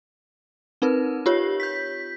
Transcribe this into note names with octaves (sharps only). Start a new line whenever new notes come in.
C4 D#4 A#4 B4
F4 G4 C#5
G6 B6